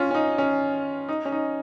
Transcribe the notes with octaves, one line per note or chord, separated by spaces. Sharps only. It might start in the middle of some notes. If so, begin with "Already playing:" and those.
Already playing: C#4 F4
C#4
D#4
C#4
D#4
C#4
D#4